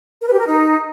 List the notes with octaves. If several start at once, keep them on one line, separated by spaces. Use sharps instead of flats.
A#4
B4
G4
A#4
D#4